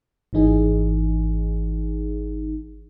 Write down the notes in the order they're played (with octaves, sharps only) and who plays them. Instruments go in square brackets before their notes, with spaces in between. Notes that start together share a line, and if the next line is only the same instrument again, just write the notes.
[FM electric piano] G#1 E3 D#4 G#4